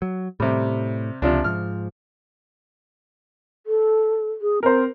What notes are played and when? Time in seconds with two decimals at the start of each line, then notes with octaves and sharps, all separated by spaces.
0.02 F#3
0.40 A2 C3 G3
1.22 C#2 C3 F3 D4
1.44 G#2 F3 F6
3.67 A4
4.42 G#4
4.63 C4 A#4 C5